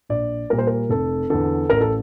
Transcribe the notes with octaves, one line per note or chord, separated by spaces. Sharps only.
A#1 D5
A#2 G3 A#4
C5
A#4
F1 A4
E2 D3 A4
A1 A#4
A4